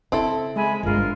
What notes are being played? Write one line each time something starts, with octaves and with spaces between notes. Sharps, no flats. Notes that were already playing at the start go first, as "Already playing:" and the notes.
C#3 C4 E4 A4
G#3 E5 G#5 B5
G1 D4 F4 A#4